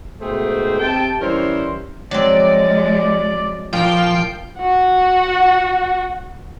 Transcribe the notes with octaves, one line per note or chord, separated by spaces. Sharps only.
G#2 B2 A3 G#4 C5 G5
C3 G5 A5
E3 G3 C#4 A#4 C5
F3 F#3 G#3 C4 D5
A#2 F3 G5 A#5 C7
F#4 F#5